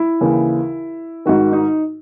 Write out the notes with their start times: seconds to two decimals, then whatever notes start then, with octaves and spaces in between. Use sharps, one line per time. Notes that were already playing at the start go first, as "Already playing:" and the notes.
Already playing: E4
0.21 D#2 C#3 E3
1.26 G#2 D#3 F#4
1.53 D#4